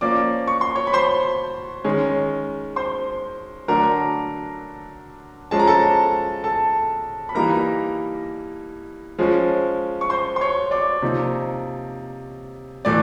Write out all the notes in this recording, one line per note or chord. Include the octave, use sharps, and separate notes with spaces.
F3 A#3 C#4 D5 D6
C#6
C6
C#5 C#6
B5
C5 C6
D#3 G#3 C#4
C5 C6
D3 F#3 A3 D4 A#4 A#5
F3 G#3 C#4 A5
A#5
A4 A5
A4 A5
B5
E3 G3 A#3 D#4 A#4 A#5
F3 G#3 C#4
C#6
C5 C6
C6
C#5 C#6
D5 D6
C3 F3 A#3 D#4
A2 E3 A3 D5 D6